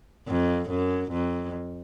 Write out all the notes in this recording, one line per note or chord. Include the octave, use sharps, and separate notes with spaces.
F2
F#2
F2